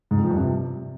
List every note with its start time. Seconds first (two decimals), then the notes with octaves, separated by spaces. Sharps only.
0.11 G#2
0.17 F2
0.24 F3
0.31 G2
0.37 C3